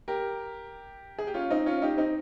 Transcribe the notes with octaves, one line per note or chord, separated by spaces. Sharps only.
G4 A#4
G#4
G4
C#4 F4
C4 D#4
C#4 F4
D#4 G4
C4 D#4